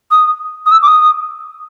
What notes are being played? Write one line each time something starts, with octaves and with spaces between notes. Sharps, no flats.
D#6
D#6
E6
D6
D#6